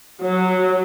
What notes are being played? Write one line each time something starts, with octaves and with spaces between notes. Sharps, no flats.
F#3